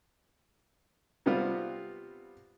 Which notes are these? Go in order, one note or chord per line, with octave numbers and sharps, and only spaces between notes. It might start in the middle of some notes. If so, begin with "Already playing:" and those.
C3 G3 B3 C4 F4